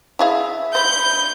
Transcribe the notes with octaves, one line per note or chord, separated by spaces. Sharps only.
E4 G#4 E5 F5
C5 B5 G6